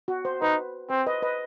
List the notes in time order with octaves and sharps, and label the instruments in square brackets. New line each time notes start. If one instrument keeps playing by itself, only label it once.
[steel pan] F#4
C5
[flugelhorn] D#4 [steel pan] B4
[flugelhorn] C4 [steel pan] C5
[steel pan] B4 D#5
B4 D#5